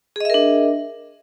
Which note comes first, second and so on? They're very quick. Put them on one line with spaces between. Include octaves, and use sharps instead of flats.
G#4 D#5 E5 A#4 D4